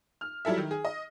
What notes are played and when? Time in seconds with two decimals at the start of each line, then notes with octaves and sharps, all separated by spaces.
0.21 F6
0.45 F#3 G3 E4 A4 E5
0.58 D#3
0.71 G#4
0.85 D#5